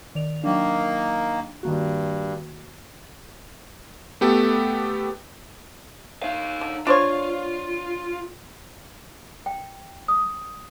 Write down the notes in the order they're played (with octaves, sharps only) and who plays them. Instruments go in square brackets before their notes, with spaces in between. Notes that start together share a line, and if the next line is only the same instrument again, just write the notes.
[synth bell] D#3 D5 F7
[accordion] D#3 A#3 [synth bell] F#3 D4
[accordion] G2 [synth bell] D#3 A#3 F#4
[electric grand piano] A3 B3 G4 A4
[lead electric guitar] D#4 F5
[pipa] D3
[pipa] D4 C5 C#5 [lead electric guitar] F4
[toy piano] G5
D#6